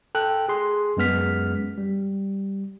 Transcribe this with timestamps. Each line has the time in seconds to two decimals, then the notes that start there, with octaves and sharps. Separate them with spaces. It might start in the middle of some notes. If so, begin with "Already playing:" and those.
0.15 A4 G5 F#6
0.49 G#4 C6
0.97 F#2 G#3 B3 F6 B6
1.78 G3